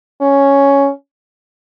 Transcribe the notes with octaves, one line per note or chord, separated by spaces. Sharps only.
C#4